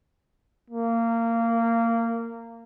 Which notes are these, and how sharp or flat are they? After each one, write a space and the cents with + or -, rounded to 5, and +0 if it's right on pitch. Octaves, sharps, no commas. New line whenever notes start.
A#3 -20